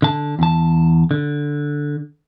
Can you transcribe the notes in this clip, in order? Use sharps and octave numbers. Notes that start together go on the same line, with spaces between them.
D3 A5
E2 A5
D3